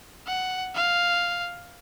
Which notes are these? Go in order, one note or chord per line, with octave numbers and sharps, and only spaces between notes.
F#5
F5